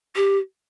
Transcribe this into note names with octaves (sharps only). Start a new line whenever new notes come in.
G4